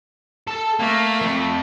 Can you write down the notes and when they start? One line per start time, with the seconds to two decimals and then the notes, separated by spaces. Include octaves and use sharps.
0.47 A4 A5
0.79 A3 A#3
1.21 F2